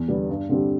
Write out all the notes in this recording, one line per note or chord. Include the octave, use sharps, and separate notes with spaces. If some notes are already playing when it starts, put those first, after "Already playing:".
Already playing: E2
D3 G3 B3
G2
D3 G3 C4 G4